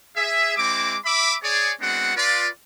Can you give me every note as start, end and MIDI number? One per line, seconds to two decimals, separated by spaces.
0.16 0.56 68
0.16 0.56 76
0.57 0.96 56
0.57 0.96 60
0.57 0.96 64
0.57 0.96 86
1.05 1.35 76
1.05 1.35 83
1.05 1.35 86
1.43 1.71 68
1.43 1.71 73
1.43 1.71 74
1.81 2.14 56
1.81 2.14 59
1.81 2.14 60
1.81 2.14 62
1.81 2.14 66
1.81 2.14 78
2.16 2.48 65
2.16 2.48 71
2.16 2.48 74